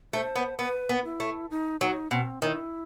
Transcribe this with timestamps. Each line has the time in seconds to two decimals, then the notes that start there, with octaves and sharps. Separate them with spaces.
0.13 A3 C5
0.35 B3
0.59 B3 B4
0.89 B3
1.05 E4
1.20 A3
1.50 D#4
1.81 F#3 D#4
2.11 B2 C4
2.42 D#3 E4